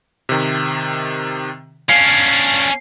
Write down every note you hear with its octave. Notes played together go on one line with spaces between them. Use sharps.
C3 D#3
C#4 D4 F5 C7